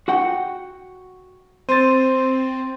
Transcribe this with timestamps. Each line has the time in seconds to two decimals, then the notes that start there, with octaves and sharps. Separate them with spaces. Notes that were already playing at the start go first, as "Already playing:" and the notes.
0.08 F#4 F#5 G5
1.69 C4 C5 C6 A6 D#7